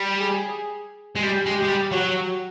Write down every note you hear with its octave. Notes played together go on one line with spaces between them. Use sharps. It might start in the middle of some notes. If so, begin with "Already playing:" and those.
Already playing: G3
G#4
G#3
G3 G4
G#3
G4
G#3
G3
F#3 F#4